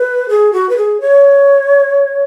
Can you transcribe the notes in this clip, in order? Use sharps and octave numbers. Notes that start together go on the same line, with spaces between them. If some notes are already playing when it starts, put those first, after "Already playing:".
Already playing: B4
G#4
F#4
B4
G#4
C#5